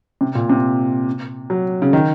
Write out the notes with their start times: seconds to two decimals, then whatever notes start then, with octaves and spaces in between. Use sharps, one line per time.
0.21 C3
0.35 A#2
0.50 C3
1.50 F#3
1.82 C#3
1.93 D#3